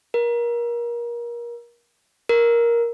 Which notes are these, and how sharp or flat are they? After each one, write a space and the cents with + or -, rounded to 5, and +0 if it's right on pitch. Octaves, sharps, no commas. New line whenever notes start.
A#4 +30
A#4 +10